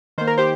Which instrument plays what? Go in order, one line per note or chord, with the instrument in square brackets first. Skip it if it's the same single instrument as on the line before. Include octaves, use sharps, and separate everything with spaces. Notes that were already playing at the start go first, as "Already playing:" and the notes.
[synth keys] D#3 A#3 C5
A#4
G4 C5